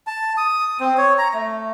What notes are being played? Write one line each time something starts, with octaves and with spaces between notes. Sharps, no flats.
A5
D#6
C4
C#5
A#5
A3